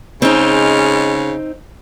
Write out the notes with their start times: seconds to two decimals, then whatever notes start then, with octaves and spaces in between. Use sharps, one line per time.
0.22 C#3 G#3 C4 D#4 F6